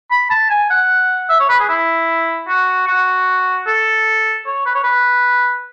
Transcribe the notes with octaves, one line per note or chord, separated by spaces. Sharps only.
B5
A5
G#5
F#5
E5
C#5
B4
G#4
E4
F#4
F#4
A4
C#5
B4
C#5
B4